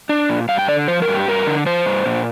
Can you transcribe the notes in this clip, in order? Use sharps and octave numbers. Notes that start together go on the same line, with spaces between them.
D4
A#2
G2 F5
G5
D3 D5
F3 C5
A#4
G2
G4
G2 A#4
D3
F3 C5
G2
A#2